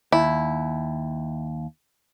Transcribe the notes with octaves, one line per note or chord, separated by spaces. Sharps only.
D#2 E4